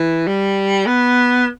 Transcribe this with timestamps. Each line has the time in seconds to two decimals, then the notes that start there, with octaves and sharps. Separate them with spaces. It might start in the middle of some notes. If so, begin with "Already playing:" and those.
Already playing: E3
0.27 G3
0.86 B3